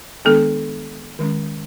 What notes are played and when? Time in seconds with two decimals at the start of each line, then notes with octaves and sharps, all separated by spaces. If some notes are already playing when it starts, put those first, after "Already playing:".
0.25 D#3 G#3 B3 D4 A4
1.19 D#3 G#3 C#4